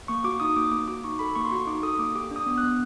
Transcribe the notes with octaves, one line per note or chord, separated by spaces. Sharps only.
A#3 C#6
F#4 D6
D#4 D#6
A#3 D6
A#3 D6
F#4 D6
D#4 C#6
A4 B5
A#3 C#6
C6
F#4 C#6
D#4 D6
A4 D#6
A#3 D6
G4 D6
D4 D#6
B3
F#6
B3